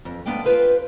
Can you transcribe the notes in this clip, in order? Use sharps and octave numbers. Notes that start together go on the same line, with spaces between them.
F2
G#2 B3 D4 F5 G5
F4 G4 B4 C5 F5